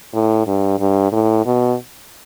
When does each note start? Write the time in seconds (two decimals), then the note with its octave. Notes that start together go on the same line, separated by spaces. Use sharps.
0.14 A2
0.47 G2
0.79 G2
1.12 A2
1.45 B2